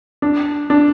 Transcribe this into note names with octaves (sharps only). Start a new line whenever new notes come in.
D4
D4